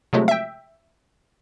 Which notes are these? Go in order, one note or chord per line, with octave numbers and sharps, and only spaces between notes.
C3 F3 F#3 G#3 A3
E5 G5